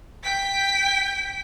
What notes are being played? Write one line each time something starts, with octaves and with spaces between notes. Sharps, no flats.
G5 B6